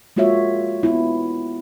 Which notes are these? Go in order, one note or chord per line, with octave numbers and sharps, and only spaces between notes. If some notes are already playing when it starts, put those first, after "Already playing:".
G#3 A#3 F4 F#4 C#5 E5
B3 E4